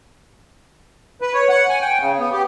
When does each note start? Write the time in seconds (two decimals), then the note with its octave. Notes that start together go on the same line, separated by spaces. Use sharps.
1.21 B4
1.34 C#5
1.49 F#5
1.69 G#5
1.81 G5
2.00 C#3
2.19 B3
2.32 G4